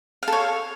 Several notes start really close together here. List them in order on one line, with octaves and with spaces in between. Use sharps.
F5 A4 C#5